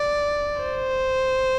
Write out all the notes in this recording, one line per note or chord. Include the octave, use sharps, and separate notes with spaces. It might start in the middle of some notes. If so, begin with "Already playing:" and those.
Already playing: D5
C5